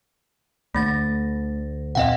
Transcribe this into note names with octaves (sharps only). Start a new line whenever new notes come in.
D2 D3 A3 A6 A#6
E2 A#2 C4 D#5 F5 F#5